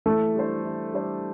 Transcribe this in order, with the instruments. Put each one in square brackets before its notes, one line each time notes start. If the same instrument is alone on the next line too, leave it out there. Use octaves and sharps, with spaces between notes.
[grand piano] E3 [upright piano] A3
[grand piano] G3 D4 A4 C5
E3
G3 D4 A4 C5